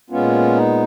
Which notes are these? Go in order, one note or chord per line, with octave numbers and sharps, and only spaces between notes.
A#2 G#3 B3 C#4 F4
D#4